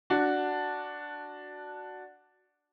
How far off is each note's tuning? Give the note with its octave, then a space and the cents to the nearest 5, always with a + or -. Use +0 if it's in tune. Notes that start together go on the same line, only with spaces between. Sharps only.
D4 +0 F#4 +0